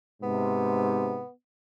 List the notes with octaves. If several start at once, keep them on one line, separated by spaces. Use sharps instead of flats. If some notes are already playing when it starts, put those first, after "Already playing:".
G#2 C3 B3